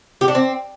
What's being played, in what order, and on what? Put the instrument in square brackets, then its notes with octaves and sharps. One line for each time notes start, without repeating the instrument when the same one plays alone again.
[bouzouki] G4
D4
C4